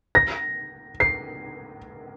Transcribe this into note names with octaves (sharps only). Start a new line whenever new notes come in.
A#6
C7